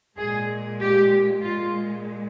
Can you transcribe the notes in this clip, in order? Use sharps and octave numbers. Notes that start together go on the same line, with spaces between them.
A#2 G#3 G#4
G4
A#2 G#3 F4